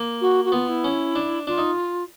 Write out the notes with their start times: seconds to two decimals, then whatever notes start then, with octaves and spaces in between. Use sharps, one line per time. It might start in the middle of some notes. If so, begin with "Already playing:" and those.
Already playing: A#3
0.21 F#4
0.44 F#4
0.52 B3 F4
0.68 E4
0.84 C#4
1.15 D4
1.47 D4 F4
1.58 D#4